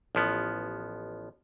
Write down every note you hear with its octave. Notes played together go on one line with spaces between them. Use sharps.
A1 F3 B3